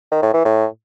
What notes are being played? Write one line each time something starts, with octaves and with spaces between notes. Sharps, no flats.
D#3
A2
E3
A2